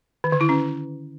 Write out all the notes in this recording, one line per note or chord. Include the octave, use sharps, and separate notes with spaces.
D#3
D3
E4
C#4